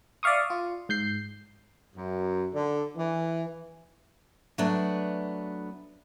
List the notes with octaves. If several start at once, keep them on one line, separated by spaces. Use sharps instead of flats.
D5 E5 F5 C#6 D#6
F4
G#2 G6 C7
F#2
D3
E3
F#3 A3 B3 D4